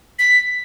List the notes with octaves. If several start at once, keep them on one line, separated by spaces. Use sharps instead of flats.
B6